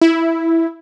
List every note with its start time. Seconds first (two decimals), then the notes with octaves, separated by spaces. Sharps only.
0.01 E4